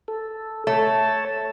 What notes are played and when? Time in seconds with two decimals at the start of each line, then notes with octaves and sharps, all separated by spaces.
0.08 A4
0.67 A3 C#5 A5